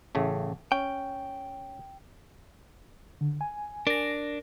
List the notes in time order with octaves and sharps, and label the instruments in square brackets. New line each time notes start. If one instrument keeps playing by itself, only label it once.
[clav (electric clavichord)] A1 C#3 A3
[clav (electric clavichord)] C#4 [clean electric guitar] G5
[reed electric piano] D3
G#5
[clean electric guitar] D4 [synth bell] A#4 A#6